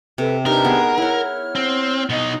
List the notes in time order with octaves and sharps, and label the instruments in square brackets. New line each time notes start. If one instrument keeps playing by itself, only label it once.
[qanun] C3 [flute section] A4 B4
[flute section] D4 G4 B4 [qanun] D#4 [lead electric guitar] A#4
[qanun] B3 G#4
[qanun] E4 F#5 [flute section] C#5 F6
[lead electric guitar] C4
[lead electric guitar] B2 D#4 [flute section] D#5 D#6